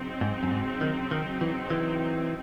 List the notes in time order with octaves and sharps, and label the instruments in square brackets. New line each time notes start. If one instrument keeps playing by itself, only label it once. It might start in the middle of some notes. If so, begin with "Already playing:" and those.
Already playing: [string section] C#3 F#3 C4 D#4
[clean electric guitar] G#2
F#2
G#2
D#3
D#3
E3
E3